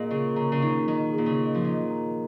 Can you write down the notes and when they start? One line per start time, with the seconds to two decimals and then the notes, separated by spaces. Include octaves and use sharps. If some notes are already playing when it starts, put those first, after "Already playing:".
Already playing: A#2 G#4 D#5 A#5
0.11 C#3 G#4
0.36 C#3 A#5
0.52 C#3
0.62 D#3 D#4
0.88 D#3 D#5
1.13 G#4
1.18 A#2
1.26 C#3
1.38 D#5
1.55 F3
1.64 D#3 D#5
1.90 A#5